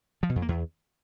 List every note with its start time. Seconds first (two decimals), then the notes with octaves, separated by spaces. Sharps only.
0.23 F3
0.29 B2
0.36 F2
0.42 A#3
0.49 E2